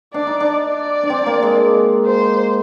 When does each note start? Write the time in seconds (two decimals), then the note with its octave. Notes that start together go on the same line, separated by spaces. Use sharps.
0.14 D4 D5
0.27 D#4
0.40 D4
0.62 D5
1.03 D4
1.10 C4
1.26 A#3
1.42 G#3
2.06 C5